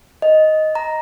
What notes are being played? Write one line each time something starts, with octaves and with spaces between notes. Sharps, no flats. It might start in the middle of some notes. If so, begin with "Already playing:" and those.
D#5
A#5